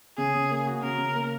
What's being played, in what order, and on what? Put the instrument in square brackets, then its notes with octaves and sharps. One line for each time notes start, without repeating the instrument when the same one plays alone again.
[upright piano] C#3 [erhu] G#4
[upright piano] C#3
A#3
F#4
[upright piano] C#3 [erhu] A#4
[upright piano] C#3
A#3